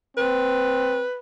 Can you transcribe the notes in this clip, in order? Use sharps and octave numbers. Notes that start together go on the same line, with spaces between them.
C4 B4